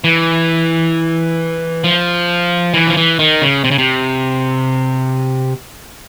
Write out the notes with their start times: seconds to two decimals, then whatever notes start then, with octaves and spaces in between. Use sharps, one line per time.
0.04 E3
1.84 F3
2.74 E3
2.87 F3
2.97 E3
3.19 D#3
3.42 C#3
3.64 C3
3.71 C#3
3.78 C3